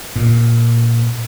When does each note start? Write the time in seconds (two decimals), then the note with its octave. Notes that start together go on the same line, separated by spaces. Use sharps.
0.16 A#2